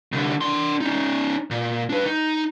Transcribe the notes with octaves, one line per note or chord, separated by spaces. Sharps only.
C2 D3
D4 C6
C#4 D#4
A#2
D4 B4
D#4